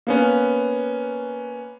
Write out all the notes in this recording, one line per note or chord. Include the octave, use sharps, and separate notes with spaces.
A#3 B3 C#4